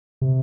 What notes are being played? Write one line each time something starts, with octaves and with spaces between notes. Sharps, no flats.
C3